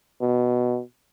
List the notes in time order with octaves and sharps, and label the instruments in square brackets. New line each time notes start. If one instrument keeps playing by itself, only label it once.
[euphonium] B2